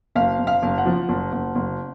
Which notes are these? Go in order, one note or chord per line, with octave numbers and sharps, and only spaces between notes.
F#1 F5
F#1
F5
F#1
F#5
F3
F#1
F#1
F#1